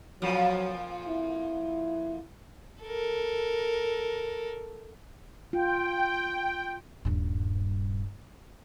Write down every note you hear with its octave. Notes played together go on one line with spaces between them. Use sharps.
F2 A#2 F3 F#3
E4
A4 A#4
F4 G5
D#1 G2